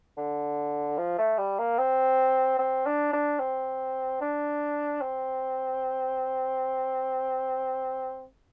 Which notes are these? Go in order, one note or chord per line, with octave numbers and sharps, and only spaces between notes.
D3
F3
A3
G3
A#3
C4
C4
D4
D4
C4
D4
C4